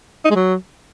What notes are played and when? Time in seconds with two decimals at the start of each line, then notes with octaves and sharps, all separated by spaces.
0.25 D#4
0.30 G#3
0.36 F#3